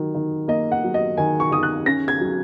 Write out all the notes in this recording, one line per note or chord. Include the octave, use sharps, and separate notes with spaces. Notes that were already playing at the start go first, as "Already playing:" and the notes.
Already playing: D#3 F#3
D#3
A#3 D#5
F#5
F#3
D#5
D#3 G#5
C#6
D#3 D#6
F#6
C#4 A#6
G#6
F#3